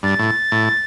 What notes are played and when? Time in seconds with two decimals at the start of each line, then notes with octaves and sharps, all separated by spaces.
0.03 G2 A6
0.19 A2
0.52 A2